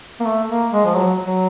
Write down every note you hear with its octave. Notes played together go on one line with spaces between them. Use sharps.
A#3
A3
A#3
G#3
F3
F#3
F#3